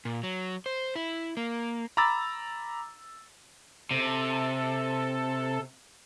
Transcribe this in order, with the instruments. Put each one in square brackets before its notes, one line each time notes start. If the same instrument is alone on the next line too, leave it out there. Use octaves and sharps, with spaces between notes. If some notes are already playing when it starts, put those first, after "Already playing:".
[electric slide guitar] A#2
F#3
C5
E4
A#3
[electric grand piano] A#5 B5 D6 E6 A6
[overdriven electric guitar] C3 [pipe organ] A4